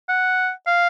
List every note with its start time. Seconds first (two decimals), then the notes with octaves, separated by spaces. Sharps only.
0.09 F#5
0.67 F5